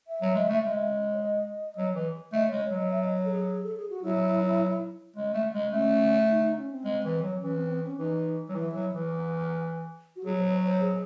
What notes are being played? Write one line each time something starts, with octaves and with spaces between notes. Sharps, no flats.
E5
F#3
G#3
A3
G#3
C#5
D#5
F#3
E3
A3 D#5
G#3 C#5
C#5
F#3
D#5
E5
D#5
C#5
A4
G#4
A4
G#4
F#4
F#3 E4
G#3
A3
G#3
A3 C#4
D#4
D#4
C#4
C4
G#3
E3
F#3
E3 C#4
C4
C4
C#4
E3 D#4
F#3
E3 E4
F#3
E3
F#4
F#3 G#4
C5
C#5
C5
G#4